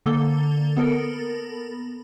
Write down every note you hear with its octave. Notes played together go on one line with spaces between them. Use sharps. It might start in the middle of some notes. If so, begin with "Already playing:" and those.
D3 A#3 A4 G7
B3 A4 A#4